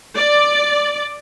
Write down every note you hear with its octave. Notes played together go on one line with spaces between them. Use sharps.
D5